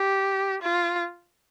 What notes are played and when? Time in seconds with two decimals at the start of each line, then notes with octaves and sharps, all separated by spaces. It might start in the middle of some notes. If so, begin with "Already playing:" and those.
Already playing: G4
0.62 F4